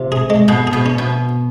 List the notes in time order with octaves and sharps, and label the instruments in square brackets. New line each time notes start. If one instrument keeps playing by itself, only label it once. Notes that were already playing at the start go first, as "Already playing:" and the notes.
Already playing: [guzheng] C3 [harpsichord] F4
[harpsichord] G#4
G#3
[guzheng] B2 [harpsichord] G#4
[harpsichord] G#4
[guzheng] B2
[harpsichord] C#4
[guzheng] B2